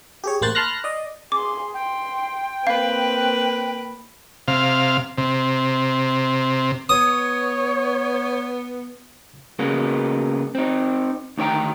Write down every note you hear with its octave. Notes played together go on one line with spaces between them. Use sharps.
G4 G#4 C#5
A1 A#3 C5 F#6 A6
A5 B5 C6 F6 F#6 A#6
D5 D#5
G#4 C6 D6
G5 C6
A#3 C4 B4 F5 F#6
C3 F5
C3
B3 C#5 D#6
C#3 G#3 A#3 B3
C4 D#4
D2 D#3 C#5 G5 A#5